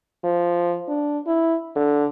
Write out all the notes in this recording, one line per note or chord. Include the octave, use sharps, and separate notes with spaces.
F3
D4
E4
D3